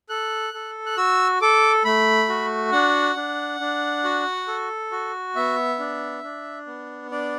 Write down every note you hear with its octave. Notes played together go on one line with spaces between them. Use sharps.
A4 F#6
A4
F#6
F#4 E6
A4 D6
A3 B5
F#4
D4 F#5
D4
D4
F#4
A4
F#4
B3 E5
D4
D4
B3
D4 D5